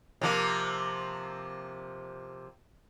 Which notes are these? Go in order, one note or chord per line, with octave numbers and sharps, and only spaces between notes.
C3 F3 A#3